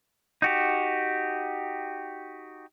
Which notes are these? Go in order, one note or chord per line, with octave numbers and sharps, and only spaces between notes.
D#4 F#4 G4